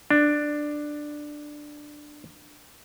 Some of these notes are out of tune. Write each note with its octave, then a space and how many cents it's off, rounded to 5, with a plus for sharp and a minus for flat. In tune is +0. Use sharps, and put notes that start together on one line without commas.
D4 +10